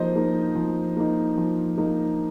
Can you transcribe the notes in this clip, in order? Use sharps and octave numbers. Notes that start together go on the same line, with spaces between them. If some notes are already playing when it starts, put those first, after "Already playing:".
Already playing: F3 A#3 D#4 C5 D#5
A#3 D#4
F3
A#3 D#4
F3
A#3 D#4